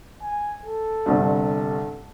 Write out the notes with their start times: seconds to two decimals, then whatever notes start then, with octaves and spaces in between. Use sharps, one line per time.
0.23 G#5
0.65 A4
1.06 G1 C2 G2